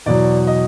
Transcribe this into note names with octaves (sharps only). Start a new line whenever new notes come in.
E2 B2 F#3 D5
D#5